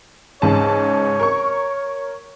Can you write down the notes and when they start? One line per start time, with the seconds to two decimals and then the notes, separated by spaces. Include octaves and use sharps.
0.42 C#2 G#2 C#5 A5
1.20 A#4 C#6